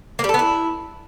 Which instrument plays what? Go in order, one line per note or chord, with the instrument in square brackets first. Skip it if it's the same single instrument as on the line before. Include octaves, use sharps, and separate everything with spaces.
[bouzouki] A#3
G3
A4
B3
E4